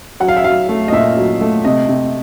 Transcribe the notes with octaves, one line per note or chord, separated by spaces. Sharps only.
F#3 F#5
F5
E5
F#3 F5
A3
D#5
A#2 E5
F#3
A3
C3 D#5
C3